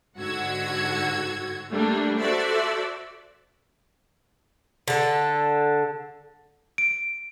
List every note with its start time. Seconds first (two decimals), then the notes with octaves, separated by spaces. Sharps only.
0.18 G#2 D3 F#4 F#5 E6 G#6
1.71 G3 A3 A#3 D4
2.19 F#4 A4 C5 D5 E5
4.88 D3 A4
6.78 D7